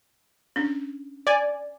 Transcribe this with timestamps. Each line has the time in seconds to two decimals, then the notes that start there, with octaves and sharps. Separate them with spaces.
0.56 C#4 D4
1.27 D5 G#5